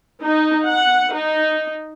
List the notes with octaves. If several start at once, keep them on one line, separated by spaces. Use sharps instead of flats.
D#4
F#5
D#4